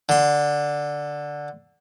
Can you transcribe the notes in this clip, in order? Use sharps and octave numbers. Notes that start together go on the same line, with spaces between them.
D3 C6